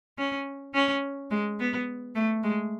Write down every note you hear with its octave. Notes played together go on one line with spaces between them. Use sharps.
C#4
C#4
G#3
B3
A3
G#3